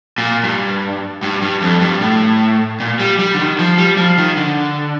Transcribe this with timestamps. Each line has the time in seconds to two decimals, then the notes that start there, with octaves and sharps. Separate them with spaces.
0.18 A#2
0.44 G2
1.23 G2
1.42 G2
1.62 F2
1.81 G2
2.01 A2
2.80 A#2
3.00 G3
3.19 G3
3.34 D3
3.39 D#3
3.59 F3
3.78 G3
3.97 F3
4.18 D#3
4.37 D3